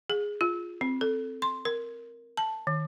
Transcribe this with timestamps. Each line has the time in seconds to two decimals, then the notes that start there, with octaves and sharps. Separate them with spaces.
0.10 G#4
0.41 F4
0.81 C4
1.01 A4
1.42 C6
1.65 A#4
2.37 A5
2.67 D#3